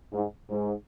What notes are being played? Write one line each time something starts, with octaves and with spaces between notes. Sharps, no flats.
G#2
G#2